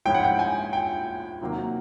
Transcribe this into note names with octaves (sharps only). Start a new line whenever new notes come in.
G#2 F3 G#3 C#4 E4 G5
F#5
G5
G#5
G5
C3 D#3 F#3 A#3